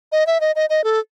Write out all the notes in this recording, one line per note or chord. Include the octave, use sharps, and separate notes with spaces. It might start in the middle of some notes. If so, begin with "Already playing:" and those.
D#5
E5
D#5
D#5
D#5
A4